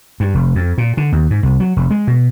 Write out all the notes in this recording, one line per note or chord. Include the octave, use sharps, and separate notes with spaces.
G2
F1
F2
A#2
D3
D#2
G#2
C2
F#3
F1
G#3
B2